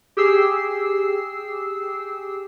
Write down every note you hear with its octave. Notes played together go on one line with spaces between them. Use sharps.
G4 G#4 E6 C7